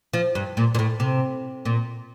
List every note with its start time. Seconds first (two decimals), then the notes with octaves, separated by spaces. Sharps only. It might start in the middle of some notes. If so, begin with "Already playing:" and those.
0.13 F3
0.35 G2
0.57 A#2
0.74 A#2
0.79 A2
1.00 C3
1.65 A#2